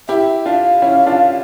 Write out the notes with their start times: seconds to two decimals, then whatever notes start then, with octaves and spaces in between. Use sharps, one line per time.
0.09 E4 G4 E5
0.46 D4 F4 F5
0.82 C#4 E4
1.07 D4 F4